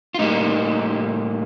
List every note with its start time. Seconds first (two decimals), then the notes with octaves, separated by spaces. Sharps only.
0.14 F4
0.19 A2 G3 A#3 D#4